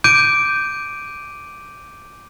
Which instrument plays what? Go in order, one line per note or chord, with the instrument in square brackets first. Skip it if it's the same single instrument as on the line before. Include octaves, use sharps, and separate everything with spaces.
[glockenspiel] D6 G6 D7 D#7